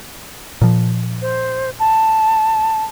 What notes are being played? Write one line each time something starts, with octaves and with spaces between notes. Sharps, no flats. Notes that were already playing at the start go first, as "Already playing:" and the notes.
A#2 F3
C5
A5